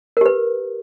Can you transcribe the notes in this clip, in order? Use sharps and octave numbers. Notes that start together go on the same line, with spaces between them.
G4 A#4 B4